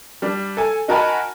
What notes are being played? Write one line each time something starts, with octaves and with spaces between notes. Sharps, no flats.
G3 D4
A4 G#5
D#4 F#4 A#4 G#5 A5 B5